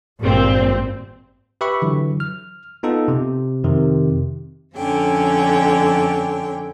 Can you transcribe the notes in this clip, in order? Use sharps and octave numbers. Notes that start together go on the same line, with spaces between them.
G#1 G2 A#2 C4
G4 B4 E5 B5 C#6
D3 E3 F#3
F6
B3 D#4 F4 A4
C3
F2 C3 D#3
F2 D3 C#4 G5